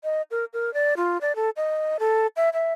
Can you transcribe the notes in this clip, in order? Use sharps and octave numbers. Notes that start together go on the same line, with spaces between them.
D#5
A#4
A#4
D5
F4
D5
A4
D#5
A4
E5
E5